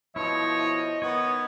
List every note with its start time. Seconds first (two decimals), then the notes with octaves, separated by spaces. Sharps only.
0.16 B2 F3 E4 C#5 D#5
1.02 D#3 B3 C#5 D#6